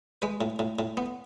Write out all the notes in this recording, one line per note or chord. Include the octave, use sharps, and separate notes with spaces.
G#3 B4
A2
A2
A2
B3